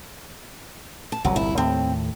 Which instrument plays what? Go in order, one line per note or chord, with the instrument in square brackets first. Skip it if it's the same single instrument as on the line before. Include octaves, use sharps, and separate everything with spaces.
[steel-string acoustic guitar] A5
[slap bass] G1 C2 A#2 [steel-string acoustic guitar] F#3
[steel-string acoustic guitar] E4
[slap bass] D#2 A2 A3 [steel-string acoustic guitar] C4